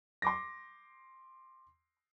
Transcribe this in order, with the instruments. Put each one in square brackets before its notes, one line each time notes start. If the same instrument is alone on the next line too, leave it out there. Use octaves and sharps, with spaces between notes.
[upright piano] C6 D6 A#6